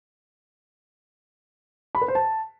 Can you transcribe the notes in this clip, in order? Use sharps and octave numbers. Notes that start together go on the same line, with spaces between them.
B5
B4
C5
A5